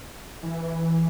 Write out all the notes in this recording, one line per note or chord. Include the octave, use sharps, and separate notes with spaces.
E3